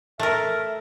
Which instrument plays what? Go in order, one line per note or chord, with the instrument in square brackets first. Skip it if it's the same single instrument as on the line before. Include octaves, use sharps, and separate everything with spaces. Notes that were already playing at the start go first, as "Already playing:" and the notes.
[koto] A3 A#4 [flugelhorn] E5